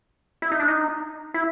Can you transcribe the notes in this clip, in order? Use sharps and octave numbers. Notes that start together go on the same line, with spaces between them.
E4
D#4
D4
D#4
E4